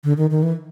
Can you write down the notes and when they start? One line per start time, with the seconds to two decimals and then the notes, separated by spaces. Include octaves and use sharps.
0.04 D3
0.17 D#3
0.31 D#3
0.43 E3